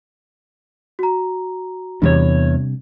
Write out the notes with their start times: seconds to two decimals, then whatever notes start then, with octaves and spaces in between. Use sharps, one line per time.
0.99 F#4 A#5
2.02 E2 C3 G3 D4 C#5